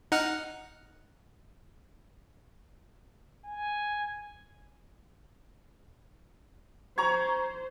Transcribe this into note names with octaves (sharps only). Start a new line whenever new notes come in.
D#4 F#5 F6
G#5
C5 A#5 C#6 G#6